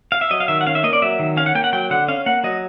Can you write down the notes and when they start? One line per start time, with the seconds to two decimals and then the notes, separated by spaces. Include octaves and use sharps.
0.12 F5
0.21 E5
0.31 F#3 D#5
0.40 F5
0.48 D#3 E5
0.61 F#5
0.67 C#4 F5
0.75 E5
0.84 A#3 D#5
0.93 D5
1.02 F#3 E5
1.19 D#3
1.37 C#4 F5
1.46 F#5
1.55 A#3 G5
1.64 F#5
1.73 F#3 G5
1.90 D3 F#5
2.08 C#4 F5
2.26 A#3 F#5
2.44 F#3 D#5